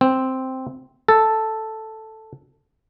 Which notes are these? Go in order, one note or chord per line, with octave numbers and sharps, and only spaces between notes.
C4
A4